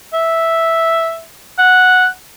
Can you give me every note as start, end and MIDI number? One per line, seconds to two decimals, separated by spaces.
0.14 1.21 76
1.59 2.07 78